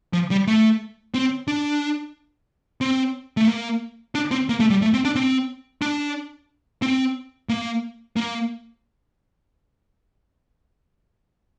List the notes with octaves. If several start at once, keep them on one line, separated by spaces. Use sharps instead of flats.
F3
G3
A3
C4
D4
C4
A3
A#3
D4
C4
A#3
A3
G3
A3
C4
D4
C4
D4
C4
A#3
A#3